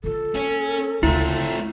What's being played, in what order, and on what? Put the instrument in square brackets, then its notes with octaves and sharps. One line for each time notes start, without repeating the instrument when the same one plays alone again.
[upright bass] D3 F4 [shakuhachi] A4
[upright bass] A#3 [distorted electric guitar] C#4
[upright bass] D2 C#3 [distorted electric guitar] A3 C4 [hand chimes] E4 [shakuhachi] F4